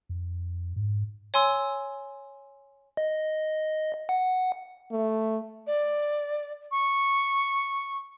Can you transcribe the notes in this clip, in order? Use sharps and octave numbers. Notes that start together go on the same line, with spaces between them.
F2
G#2
C#5 G#5 C6 E6
D#5
F#5
A3
D5
C#6